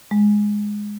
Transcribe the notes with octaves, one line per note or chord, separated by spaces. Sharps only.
G#3